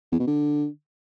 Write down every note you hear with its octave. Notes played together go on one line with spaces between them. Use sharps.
E2
B2
D3